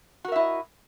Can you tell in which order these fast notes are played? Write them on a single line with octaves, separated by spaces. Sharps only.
F#4 A#4 E5 E4 D#5